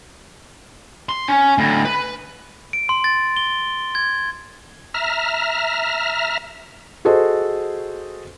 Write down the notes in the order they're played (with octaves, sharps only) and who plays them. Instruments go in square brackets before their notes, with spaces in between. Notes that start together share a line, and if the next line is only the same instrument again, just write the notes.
[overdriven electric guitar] C6
C#4
D2 A2
B4
[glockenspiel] D7
C6
A6
G7
G#6
[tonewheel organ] E5 A#5 F6
[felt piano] F#4 G#4 A4 C5 D#5